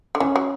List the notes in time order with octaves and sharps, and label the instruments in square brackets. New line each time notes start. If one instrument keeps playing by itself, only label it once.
[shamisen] D3
[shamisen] E3 [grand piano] C#4
[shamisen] F#3